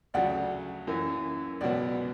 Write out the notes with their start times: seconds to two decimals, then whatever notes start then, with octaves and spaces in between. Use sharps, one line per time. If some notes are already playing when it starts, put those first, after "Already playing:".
0.14 D2 C#3 F#3 D5 F#5
0.87 F#2 E3 A#3
1.61 C#2 B2 F#3 B3 D5 F#5